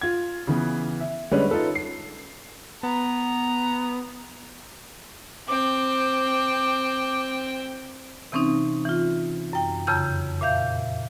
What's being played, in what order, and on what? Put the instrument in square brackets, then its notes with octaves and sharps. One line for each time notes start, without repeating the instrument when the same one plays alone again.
[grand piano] F4 G#6
C#3 E3 B3
E5
D3 G3 G#3 C#4 B4 C#5
D#4 F4 A4 B4
C7
[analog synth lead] B3 [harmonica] A#5
[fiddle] C4 G5 [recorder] D6
[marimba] C3 E3 C4 C#4 D#4
E3 F4
F#2 G5
F2 C#3 A#5 E6 G6
A#2 E5 F5 G6